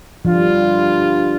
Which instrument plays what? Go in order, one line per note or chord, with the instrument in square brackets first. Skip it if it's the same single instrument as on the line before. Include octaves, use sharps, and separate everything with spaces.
[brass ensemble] G2 D3 G3 D4 F4 [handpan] F3